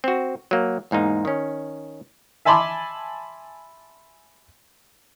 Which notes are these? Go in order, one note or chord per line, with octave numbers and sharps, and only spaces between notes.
C4 F#4
F#3 A#3
E2 G#2 A#3 D#4
D#3 C#4
E5 G#5 A5 B5 C6 D6